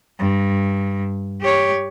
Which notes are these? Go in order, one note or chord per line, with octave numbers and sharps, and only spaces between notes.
G2
G4 C#5